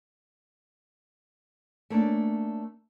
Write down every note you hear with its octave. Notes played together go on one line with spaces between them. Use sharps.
A3 A#3 C#4 D4